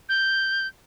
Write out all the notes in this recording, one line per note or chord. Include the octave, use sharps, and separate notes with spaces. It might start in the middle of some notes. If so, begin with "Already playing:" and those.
G6